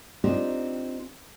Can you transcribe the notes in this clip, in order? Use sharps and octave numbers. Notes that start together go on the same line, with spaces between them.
C4 D4 D#4 F4 G4 C5